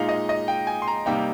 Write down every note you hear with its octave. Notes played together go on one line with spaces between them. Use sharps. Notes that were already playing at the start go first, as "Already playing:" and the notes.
Already playing: A#2 G#3 D#4 F5
D#5
D#5
G5
G#5
C6
A#5
C3 G3 A#3 D#4 G5